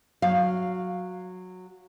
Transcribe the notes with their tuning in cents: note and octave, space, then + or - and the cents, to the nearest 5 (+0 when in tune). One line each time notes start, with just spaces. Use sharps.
F#3 -10 F5 +0